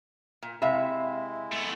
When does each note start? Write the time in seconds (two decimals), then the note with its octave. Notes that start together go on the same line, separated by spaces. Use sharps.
0.43 A#2
0.62 C3 G#3 E4 E5 F5 B5
1.52 A3 B3